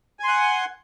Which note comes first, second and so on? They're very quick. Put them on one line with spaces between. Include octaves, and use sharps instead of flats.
G#5 C6 F#5